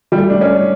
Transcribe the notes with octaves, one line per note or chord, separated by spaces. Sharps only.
G3
A3
D4
C#4